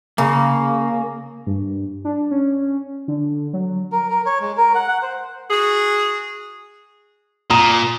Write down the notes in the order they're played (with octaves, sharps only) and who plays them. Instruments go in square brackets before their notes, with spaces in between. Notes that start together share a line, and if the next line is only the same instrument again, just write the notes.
[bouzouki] C#3 [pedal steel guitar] A#3
[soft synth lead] G2
D4
C#4
D3
F#3
[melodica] A#4
A#4
C#5
G#3
A#4
F#5
F#5
C5
[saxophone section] F#4 G#4
[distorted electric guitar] A#2 [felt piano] A#5 D#6